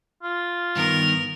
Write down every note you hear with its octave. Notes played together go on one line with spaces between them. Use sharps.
F4
G2 D#3 B3 A#4